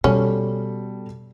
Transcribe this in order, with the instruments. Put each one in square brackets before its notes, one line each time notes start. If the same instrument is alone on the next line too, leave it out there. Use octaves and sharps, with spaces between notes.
[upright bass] B2 [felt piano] G3 A4 [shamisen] C#4